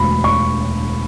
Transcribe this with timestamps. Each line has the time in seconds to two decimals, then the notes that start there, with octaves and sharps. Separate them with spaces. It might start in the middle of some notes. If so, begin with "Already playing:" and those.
Already playing: E1 D2 D3 B5
0.24 C#6